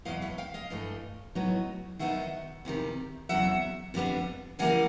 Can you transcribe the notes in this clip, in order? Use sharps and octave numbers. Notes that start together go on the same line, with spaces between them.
E2 B2 F#3 D#5 F5
E5 F#5
F5 G5
D#5 F5
G2 E3 A3
A2 F#3 B3 D#4
D#3 F#3 B3 D#4 E5 F#5
E2 C3 D#3 G3
E2 C#3 F#3 E5 F#5
F2 D3 G3 B3 D4
C#3 E3 G3 A#3 F#5 G#5